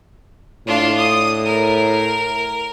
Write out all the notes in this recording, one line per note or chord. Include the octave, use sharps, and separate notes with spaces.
A2 D4 F4
D#6
A#4